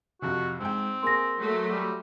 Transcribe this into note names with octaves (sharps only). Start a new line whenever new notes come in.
F2 C3 F#4
G#2 C4 G5
A#3 G#4 C6 A#6
F#3 A3
G3